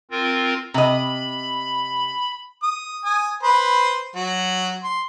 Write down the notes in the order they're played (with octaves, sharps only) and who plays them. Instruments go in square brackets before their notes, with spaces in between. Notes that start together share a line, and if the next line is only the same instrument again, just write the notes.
[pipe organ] C4 F4 A#4
[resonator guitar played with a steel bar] C3 D#5 [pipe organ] B5
[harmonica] D#6
G#5 D#6
B4 C5 B5
F#3 F#4
C6